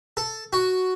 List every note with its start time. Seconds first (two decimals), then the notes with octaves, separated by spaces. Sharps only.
0.17 A4
0.53 F#4